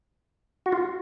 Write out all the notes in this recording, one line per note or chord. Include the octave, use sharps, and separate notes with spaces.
F#4
F4